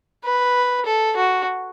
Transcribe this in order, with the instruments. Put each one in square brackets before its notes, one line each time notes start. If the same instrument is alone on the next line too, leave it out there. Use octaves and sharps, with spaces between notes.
[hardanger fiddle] B4
A4
F#4